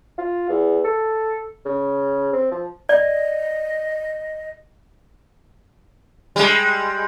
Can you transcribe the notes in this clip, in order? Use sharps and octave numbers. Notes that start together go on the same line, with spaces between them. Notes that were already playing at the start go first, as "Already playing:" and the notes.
F4
E2
A4
C#3
C4
F3
D5 D#5
G3 G#3